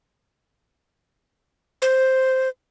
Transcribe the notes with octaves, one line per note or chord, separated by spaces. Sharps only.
C5